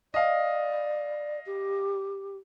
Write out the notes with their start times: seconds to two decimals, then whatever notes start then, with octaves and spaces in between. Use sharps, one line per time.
0.14 D5 D#5 F5
1.46 G4